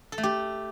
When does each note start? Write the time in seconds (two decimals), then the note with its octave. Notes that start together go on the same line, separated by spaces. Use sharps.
0.12 A4
0.18 A3
0.23 G4